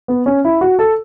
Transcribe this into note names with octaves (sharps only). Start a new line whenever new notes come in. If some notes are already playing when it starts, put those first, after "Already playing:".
B3
C#4
E4
F#4
A4